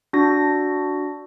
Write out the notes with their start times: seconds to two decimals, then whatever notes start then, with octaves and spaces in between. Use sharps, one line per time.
0.13 D4 F#4 A#6